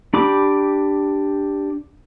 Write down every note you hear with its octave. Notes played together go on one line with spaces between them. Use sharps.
D4 G4 B5 D6